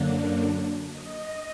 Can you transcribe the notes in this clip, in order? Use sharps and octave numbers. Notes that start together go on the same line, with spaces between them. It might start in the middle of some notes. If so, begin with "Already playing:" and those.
Already playing: F#2 D3 F#3 A#3 D4
D#5